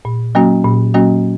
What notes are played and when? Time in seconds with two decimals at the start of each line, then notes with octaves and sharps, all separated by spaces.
0.05 A#2
0.35 F#3 A#3 C#4 F#4
0.64 A#2
0.94 F#3 A#3 C#4 F#4